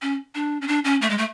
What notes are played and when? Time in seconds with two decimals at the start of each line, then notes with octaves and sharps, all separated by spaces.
0.02 C#4
0.35 D4
0.61 C#4
0.68 D4
0.84 C#4
1.01 A3
1.10 G#3
1.18 A3